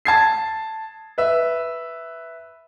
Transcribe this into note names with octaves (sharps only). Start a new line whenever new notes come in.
A5 G#6 C7
B4 E5